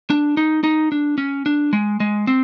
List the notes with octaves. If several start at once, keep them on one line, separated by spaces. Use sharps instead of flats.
D4
D#4
D#4
D4
C#4
D4
G#3
G#3
C4